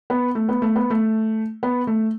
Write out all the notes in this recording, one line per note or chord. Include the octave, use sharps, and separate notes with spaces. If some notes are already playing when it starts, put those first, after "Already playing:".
B3
A3
B3
A3
B3
A3
B3
A3